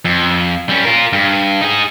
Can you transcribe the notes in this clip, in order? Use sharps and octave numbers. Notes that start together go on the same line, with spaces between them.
F2
G3 C#4
F4 A#4
G2
D#4 G#4